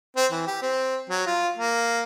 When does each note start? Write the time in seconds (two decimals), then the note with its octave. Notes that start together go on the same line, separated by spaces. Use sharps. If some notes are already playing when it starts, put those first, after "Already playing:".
0.16 C4
0.31 E3
0.47 G4
0.62 C4
1.09 F#3
1.26 F4
1.57 A#3